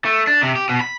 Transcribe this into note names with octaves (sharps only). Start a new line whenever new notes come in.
A3
D4
C3
G4
B2
B5